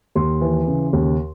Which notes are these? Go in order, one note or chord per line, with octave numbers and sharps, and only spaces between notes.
D#2 C6
E3
C#3
D#2